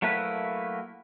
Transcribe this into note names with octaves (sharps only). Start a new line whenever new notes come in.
F#3 A3 A#3 E4 B4